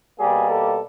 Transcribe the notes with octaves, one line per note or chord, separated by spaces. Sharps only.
B2 G3 A#3 G#4
A4